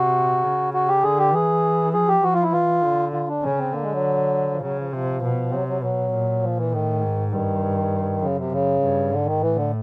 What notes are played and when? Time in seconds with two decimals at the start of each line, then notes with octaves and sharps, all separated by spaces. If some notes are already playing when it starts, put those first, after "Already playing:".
Already playing: C3 F#4
0.44 C#3
0.74 F#4
0.88 G4
1.03 D3 G#4
1.19 G4
1.33 E3 G#4
1.93 F3 G#4
2.08 G4
2.23 F3 F#4
2.33 F4
2.43 E4
2.53 E3 F4
2.84 D3
3.13 F4
3.29 D4
3.43 C#3 C#4
3.58 C4
3.73 D3 A#3
3.83 G#3
3.92 F#3
4.51 F3
4.62 C#3 F#3
4.78 F3
4.93 C3 F3
5.23 B2
5.52 C3 F#3
5.68 F#3
5.82 B2 F#3
6.12 A#2
6.42 F3
6.57 E3
6.72 A2 D#3
7.02 G#2
7.32 G2 D#3
8.21 F#2 C#3
8.37 C3
8.52 C#3
8.81 G2
9.12 G#2 D3
9.26 D#3
9.41 A2 E3
9.56 D3